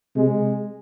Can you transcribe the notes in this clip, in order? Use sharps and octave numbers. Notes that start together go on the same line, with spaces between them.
C3 G#3